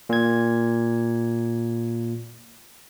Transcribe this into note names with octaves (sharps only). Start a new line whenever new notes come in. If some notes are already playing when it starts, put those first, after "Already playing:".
A#2 G#6